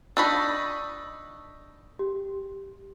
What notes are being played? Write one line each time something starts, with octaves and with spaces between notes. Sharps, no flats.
D4 D#4 B5 C#6 E6
G4